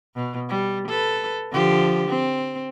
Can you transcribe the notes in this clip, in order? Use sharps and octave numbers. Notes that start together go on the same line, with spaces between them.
B2
G3
A4 B4
D3 F3 G4
C4